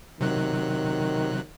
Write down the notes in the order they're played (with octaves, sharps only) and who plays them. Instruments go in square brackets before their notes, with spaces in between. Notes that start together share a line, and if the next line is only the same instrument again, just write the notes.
[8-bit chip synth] C3 F#3 F#6 [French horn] D#3